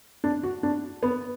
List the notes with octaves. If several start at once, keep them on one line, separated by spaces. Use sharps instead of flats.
D4
F#4
D4
B3